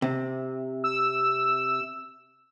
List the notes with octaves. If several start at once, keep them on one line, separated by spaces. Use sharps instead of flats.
C3
E6